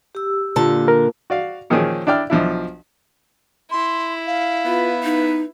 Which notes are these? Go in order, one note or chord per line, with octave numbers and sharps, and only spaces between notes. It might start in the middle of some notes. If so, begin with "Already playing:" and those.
G4 E6
A#2 D3 A5
A#4
F#4 D5 F5
A#2 D#3 F3 C#4 G#4
D4 E4 D5 G5 F6
B1 F3 D4 E4
E4 C6
F5
B3 F4 B4
D#4